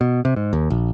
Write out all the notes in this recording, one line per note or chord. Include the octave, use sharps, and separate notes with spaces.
B2
C3
G#2
D#2
A#1